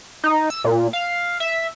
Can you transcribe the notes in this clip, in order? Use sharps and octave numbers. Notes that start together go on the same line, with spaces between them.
D#4
E6
A#2
F5
E5